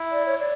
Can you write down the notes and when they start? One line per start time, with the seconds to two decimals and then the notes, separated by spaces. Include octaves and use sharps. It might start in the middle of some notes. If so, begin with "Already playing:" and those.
Already playing: E4
0.12 D5
0.26 C#5
0.39 D5